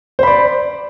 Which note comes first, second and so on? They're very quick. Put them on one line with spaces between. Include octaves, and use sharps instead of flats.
C5 B5 D5